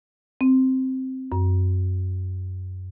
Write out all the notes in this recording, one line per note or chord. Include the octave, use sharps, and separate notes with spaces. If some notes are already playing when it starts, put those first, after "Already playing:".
C4
F#2